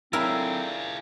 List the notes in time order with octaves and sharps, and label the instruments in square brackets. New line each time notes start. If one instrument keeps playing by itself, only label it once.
[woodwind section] D3 F#3 C4 [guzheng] E4 A#4 [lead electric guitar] F4 G#4